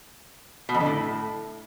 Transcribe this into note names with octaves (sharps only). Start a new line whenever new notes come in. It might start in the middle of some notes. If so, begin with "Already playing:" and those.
B2
F2
D3
A2